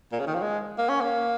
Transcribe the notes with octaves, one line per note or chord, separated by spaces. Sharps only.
A#2
C#3
D#3
F3
G#3
A#3
C#4
A#3